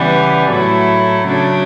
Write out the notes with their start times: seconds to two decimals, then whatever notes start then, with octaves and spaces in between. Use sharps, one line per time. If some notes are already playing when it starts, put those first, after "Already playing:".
Already playing: C#3 E3 G3 B3
0.50 A2 F#3 A3 E4
1.28 C#3 F#3 A3 D4